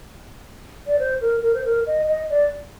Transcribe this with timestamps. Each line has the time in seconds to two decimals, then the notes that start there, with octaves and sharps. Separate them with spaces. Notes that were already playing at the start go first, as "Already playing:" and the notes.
0.87 D5
0.99 C5
1.21 A#4
1.42 A#4
1.54 C5
1.65 A#4
1.87 D#5
2.07 D#5
2.30 D5